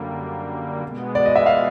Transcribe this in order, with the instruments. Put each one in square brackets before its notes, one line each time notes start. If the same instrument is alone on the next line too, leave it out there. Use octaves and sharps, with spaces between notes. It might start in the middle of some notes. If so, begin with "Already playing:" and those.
Already playing: [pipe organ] F#2 D3 G3 A#3
B2 G#3 B3
[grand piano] D5
D#5
E5
F5